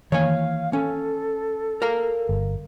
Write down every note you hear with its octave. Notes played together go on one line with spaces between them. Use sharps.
D#3 E3 A#3 C#5 F5 G#5
C#4 A4
A#4 F5 A#5
G1